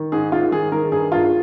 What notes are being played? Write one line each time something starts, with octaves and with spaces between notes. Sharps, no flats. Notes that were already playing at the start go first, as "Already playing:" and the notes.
Already playing: D#3
G#2 G#4
G#2 F4
D#3 G#4
D#3 A#4
G2 G#4
G2 F4